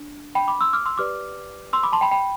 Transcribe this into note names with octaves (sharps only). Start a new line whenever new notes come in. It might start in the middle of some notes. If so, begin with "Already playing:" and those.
Already playing: D4
G5 B5
B5 D6
C6 E6
D6 F6
C6 E6
G4 B4 D5 D6 F6
C6 E6
B5 D6
A5 C6
G5 B5
G5 B5